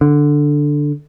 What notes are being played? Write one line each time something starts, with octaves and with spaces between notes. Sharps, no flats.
D3